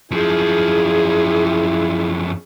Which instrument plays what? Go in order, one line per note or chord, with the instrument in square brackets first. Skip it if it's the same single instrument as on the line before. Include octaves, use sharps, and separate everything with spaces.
[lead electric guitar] F#2 F3 [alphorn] E4 [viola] G#4